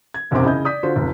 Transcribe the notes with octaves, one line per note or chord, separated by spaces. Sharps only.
G#6
E1 B1 F#2 C3 C4 D6
C#3 E4 D#5 G6
D5 D#6 G6 B6
D3 F4 F#4 C5
F1 C#2